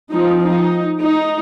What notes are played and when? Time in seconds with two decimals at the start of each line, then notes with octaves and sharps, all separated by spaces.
0.11 F3 C4 D#4
0.42 D#4
1.01 D#4